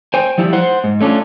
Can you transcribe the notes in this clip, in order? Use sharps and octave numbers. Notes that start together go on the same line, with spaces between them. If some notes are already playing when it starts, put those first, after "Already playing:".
C5 G5 G#5
F3 G3 E4
C5 F#5
G#2
A3 C#4 D4 F4